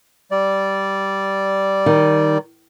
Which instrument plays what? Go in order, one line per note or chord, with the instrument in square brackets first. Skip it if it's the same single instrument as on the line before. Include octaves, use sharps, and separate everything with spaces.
[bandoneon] G3 D5
[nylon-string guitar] D#3